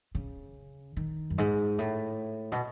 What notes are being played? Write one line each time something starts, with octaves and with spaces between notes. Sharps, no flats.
C#3
D#3
F#2
G#2
A2
B2